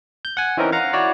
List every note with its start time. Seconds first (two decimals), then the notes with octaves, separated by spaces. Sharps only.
0.25 G6
0.37 F#5 G#5
0.57 E3 C4 C#4 D#4 A#4
0.72 F5 F#5 A#5
0.93 E4 F#4 C#5 D5